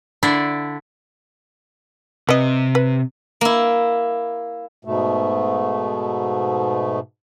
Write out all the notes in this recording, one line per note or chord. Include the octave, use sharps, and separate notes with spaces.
D3 D4 E4 D5
C3 B4 D#5
B4
A#3 E4
G#2 B2 A3